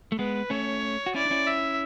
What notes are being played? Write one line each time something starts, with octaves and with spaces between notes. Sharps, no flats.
A3
G#3 B3 B4
A3 C#4 C#5
F#4
C#4 E4 D5
D4
C#4 E4
E5